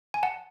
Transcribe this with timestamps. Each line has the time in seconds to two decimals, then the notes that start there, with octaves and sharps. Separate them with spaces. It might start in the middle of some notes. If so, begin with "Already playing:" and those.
0.14 G#5
0.23 F#5 A5